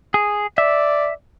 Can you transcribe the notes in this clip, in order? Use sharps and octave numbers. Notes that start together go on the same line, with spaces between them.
G#4
D5 E5